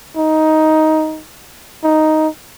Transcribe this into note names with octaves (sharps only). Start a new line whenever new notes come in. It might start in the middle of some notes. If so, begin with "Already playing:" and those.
D#4
D#4